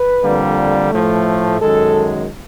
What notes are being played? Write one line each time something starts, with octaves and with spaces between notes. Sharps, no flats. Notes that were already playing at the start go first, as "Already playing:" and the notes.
Already playing: B4
F2 D3 G3 A#3
A2 F3 A3
F#2 D#3 G#3 A4